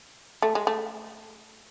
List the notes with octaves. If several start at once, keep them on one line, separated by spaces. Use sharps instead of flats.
A3
G#3
A3